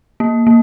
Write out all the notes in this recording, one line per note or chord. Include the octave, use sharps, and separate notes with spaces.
A#3
A#3